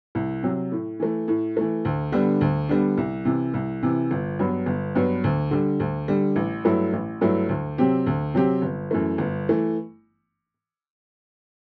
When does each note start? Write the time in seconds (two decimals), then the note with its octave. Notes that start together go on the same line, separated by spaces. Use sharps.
0.15 C2
0.43 C3 F#3
0.72 A2
1.00 E3 A3
1.28 A2
1.57 E3 A3
1.85 D2
2.12 D3 G3 B3 D4
2.41 D2
2.69 D3 G3 B3 D4
2.97 C2
3.25 C3 E3
3.54 C2
3.83 C3 E3
4.11 G1
4.39 G2 F#3 B3
4.66 G1
4.95 G2 F#3 B3
5.24 D2
5.51 D3 G3
5.80 D2
6.08 D3 G3
6.36 A1
6.65 G2 F#3 A3 E4
6.93 A1
7.21 G2 F#3 A3 E4
7.49 D2
7.78 C3 F#3 C4 G4
8.06 D2
8.34 C3 F#3 C4 G4
8.62 G1
8.91 F#2 E3 A3
9.18 G1
9.49 E3 A3